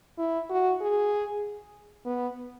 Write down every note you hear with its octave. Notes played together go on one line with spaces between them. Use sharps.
E4
F#4
G#4
B3